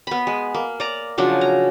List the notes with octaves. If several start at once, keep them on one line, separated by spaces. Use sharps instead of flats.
B3 B5
G#3
A#3
D5 A#5
C#3 F3 F#3 D4
A#5